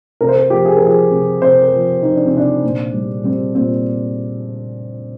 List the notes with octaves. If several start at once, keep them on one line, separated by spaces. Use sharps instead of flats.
C3 A#4
C5
A#4
F3 G4
G#4
A#4
F3 G#4
C3
C3 C5
A#4
F3
F3 D#4
D4
C4
C3 D4
A#2
G3
G3 C4
A#2 C4